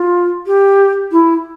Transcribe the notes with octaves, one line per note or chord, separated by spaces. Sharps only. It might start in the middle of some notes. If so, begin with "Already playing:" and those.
Already playing: F4
G4
E4